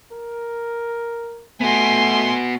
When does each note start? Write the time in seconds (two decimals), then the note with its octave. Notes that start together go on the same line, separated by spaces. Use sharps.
0.11 A#4
1.61 A3 B3 F#4 G#5 C6